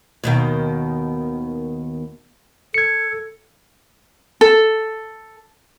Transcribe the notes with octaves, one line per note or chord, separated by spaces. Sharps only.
D#2 B2 D#3
A4 G#6 C#7
A4